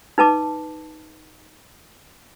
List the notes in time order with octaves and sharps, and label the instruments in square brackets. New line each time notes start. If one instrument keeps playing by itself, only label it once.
[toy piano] D#4 B4 A5 D6